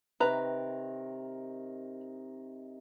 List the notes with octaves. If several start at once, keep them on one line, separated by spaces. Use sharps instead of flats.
C3 D#3 A#4 B4 A#5